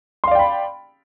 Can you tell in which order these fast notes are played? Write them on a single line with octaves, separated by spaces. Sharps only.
C6 F5 D5 G5 B5